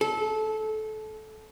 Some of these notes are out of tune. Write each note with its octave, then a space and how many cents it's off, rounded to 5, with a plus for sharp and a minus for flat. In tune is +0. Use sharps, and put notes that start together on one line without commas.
A4 -20